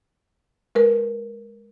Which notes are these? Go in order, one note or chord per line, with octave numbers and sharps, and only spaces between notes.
G#3 A#4 B4